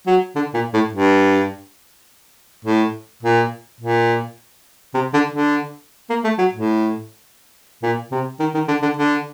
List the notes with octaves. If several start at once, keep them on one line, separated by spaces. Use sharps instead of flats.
F#3
D3
A#2
A2
G2
A2
A#2
A#2
C3
D3
D3
A#3
A3
F#3
A2
A#2
C3
D#3
D#3
D3
D3
D3